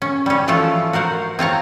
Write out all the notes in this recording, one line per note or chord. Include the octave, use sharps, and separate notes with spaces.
C#4
G3 C#4
E3 F3 A3 E4 F4 A4
F#4 A#4 C5 F#5
C4 F4 C#5 A#5